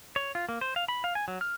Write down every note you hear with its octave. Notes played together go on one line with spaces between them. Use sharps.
C#5
F4
A#3
C5
F5
B5
F5
G#5
F#3
F6